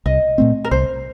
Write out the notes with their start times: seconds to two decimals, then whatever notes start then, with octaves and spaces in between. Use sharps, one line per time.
0.06 C2 D#5
0.38 A#2 A3 C4
0.64 A#4
0.71 C2 C5